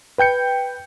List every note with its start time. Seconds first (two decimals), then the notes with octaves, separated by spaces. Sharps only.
0.18 B4 G5 G6 C#7